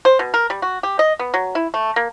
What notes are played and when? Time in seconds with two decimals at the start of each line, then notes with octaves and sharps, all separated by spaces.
0.05 C5
0.19 B2
0.34 A#4
0.50 G3
0.62 F#4
0.83 G4
0.99 D#5
1.19 B3
1.34 F#3
1.55 E4
1.74 A3
1.96 A#3